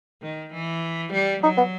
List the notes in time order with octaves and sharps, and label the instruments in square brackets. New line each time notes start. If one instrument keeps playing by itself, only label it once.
[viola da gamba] D#3
E3
G3
[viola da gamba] F#3 [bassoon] D#4
[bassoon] B3